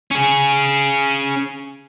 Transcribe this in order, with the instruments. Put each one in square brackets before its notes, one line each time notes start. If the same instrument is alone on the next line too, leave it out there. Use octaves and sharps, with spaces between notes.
[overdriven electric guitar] C#4 G#4